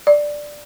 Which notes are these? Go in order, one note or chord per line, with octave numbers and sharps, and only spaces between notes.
D5